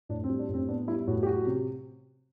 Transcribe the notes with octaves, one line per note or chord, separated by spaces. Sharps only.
A2 D4
C4
G3
D4
A2 C4
B3 D4
G3 E4
A2 F#4
G4
F#3 F#4
C3